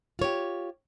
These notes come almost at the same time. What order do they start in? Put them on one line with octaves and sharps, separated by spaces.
F4 C#5 G4